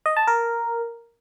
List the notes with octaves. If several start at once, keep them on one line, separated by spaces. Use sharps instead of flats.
D#5
A5
A#4